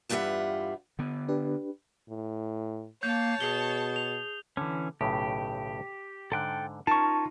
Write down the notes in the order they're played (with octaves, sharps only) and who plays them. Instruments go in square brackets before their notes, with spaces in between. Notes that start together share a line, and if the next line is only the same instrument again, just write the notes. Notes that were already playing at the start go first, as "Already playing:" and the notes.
[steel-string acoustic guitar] E2 G2 F4 G4 E5 F#5
[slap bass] D3 B3
[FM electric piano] D4 G4 B4
[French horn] A2
[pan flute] A#3 [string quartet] C#5 A5 [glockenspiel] G6
[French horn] B2 [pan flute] G#4 [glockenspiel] G7
[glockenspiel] F7
[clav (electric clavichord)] D3 [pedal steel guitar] E3 C#4
[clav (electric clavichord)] B1 A2 C#3 [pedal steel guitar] G4
[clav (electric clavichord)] G#2 D3 [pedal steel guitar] A4 G5 F#6
[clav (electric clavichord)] C#4 A#4 [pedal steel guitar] D#4 F4 [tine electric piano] A5 C#6